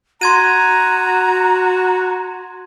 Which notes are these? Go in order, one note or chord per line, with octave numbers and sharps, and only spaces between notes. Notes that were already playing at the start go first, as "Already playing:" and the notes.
F#4 A#5 C6 G#6 D#7